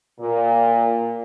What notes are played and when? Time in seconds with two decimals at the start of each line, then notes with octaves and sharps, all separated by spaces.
0.20 A#2